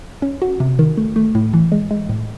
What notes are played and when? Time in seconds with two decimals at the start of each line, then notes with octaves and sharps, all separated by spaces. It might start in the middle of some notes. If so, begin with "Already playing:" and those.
0.22 C#4
0.42 F#4
0.60 C3
0.79 D#3
0.97 A3
1.16 A3
1.35 A2
1.54 E3
1.72 G#3
1.91 G#3
2.09 A2